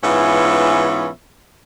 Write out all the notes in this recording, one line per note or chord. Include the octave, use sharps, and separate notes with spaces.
G#2 E3 B3 C#4 F4 E5